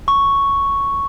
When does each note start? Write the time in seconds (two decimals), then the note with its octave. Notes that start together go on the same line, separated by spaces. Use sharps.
0.08 C#6